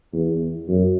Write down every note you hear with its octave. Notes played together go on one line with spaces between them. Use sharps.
E2
F#2